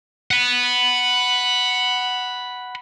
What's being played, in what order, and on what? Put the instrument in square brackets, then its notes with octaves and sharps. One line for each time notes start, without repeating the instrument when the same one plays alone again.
[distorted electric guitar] F#5 B5